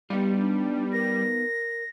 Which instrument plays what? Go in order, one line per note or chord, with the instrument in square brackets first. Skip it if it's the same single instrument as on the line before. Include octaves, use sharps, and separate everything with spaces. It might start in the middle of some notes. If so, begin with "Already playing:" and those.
[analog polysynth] G3 [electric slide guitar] B3 D#4 F4 [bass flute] G4
[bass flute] D4
[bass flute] A#4 [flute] A#6